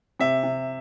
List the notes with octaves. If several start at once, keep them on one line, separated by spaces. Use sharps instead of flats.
C3 E5
C3